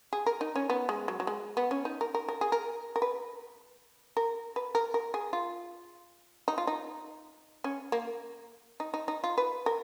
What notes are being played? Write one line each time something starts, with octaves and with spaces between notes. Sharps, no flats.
G#4
A#4
D#4
C#4
B3
G#3
F#3
F#3
G#3
B3
C#4
D#4
A#4
A#4
A#4
G#4
A#4
A#4
B4
A#4
B4
A#4
A#4
G#4
F4
D#4
F4
D#4
C#4
A#3
D#4
D#4
D#4
F4
B4
A#4